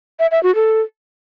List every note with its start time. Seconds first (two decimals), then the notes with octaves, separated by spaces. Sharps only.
0.19 E5
0.31 E5
0.43 F#4
0.55 A4